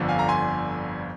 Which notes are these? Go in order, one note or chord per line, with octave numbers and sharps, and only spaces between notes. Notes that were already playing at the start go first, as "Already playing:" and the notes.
Already playing: G1 F2 D3
F5 G#5
A#5
G#5 C6